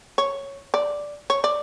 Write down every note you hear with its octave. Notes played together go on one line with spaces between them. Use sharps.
C#5
D5
C#5
D5